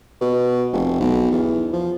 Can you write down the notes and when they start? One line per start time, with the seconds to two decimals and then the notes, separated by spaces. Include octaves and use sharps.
0.21 B2
0.73 F1
1.00 B1
1.31 E2
1.73 F3